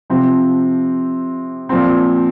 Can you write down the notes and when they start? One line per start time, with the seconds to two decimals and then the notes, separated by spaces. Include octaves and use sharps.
0.10 C3 F3 C4
1.69 A#2 F3 C4